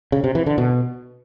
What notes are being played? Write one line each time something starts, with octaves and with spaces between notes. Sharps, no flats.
C#3
C3
E3
D3
B2